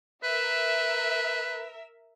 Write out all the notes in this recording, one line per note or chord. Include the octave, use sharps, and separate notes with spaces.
A#4 B4 E5